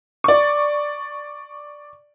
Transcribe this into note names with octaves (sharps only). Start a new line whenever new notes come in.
D5 C#6